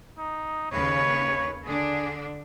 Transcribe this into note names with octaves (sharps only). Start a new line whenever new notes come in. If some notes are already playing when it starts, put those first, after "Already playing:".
D#4
D#2 C#3 B4 C#5
D3 D4 G#4